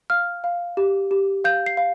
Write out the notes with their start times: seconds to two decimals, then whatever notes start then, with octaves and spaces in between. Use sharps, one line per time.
0.10 F5 F6
0.44 F5
0.77 G4
1.11 G4
1.44 F5 G6
1.66 C7
1.77 F5